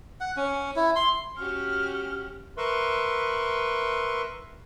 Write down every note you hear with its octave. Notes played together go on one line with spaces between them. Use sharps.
F#5
C#4
E4
C6
C#4 F#4 G4 F6
A#4 B4 E5 C6 C#6